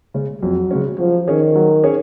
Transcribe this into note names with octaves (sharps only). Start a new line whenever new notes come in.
C#3 G#3 C#4
F2 F#3
C#3 G#3 C#4
F3 F#3
D#3 C#4 G#4 C#5
F#3
C#4 G#4 C#5